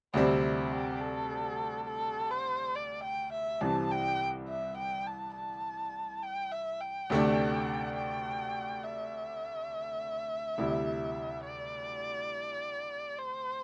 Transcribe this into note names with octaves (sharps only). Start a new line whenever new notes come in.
D2 C3 G3 C4 E4
E4
G4
A4
A4
C5
D5
G5
E5
C2 C3 E3 C4 A5
G5
E5
G5
A5
A5
G5
E5
G5
D2 C3 A3 D4
G5
E5
D2 C3 G3 E4
D5
C5